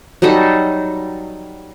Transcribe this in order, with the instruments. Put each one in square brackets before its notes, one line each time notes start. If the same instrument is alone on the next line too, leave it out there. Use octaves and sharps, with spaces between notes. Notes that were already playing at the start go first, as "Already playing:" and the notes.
[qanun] F#3 G3 D#4 A4